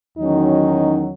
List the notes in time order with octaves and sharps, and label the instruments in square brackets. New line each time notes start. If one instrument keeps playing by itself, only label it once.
[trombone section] E2 D#3 F#3 C#4 [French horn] D#4